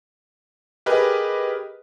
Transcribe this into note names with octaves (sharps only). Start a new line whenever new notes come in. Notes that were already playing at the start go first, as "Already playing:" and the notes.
G4 G#4 A#4 B4 D#5